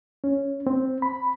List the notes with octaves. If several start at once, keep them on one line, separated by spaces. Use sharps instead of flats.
C#4
C4
B5